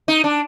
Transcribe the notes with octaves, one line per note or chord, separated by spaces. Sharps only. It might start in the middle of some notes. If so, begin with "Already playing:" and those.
D#4
D4